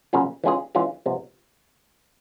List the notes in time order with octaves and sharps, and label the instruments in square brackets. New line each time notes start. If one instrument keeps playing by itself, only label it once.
[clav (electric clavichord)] C#3 F#3 A#3 C#4 F4
E3 G#3 C#4 F4 G#4
E3 G#3 C#4 F4 G#4
C3 F3 G#3 B3